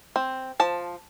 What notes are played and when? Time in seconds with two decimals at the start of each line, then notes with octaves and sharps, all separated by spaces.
0.16 C4
0.60 F3 A5